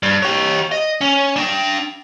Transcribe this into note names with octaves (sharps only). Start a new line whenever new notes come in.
G2
G4 C#5
D#5
C#4
D4 G5